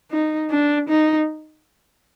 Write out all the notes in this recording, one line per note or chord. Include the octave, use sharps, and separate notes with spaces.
D#4
D4
D#4